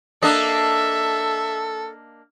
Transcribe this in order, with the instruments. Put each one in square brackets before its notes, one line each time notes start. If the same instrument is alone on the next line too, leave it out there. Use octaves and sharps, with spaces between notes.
[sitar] A#3 D4 D#5 [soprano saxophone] A4 [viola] E5